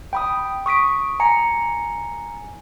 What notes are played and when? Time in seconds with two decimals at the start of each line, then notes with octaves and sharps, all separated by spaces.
0.13 G5 B5 D#6
0.66 C#6 D#6 B6 D7
1.20 G#5 A#5 C#7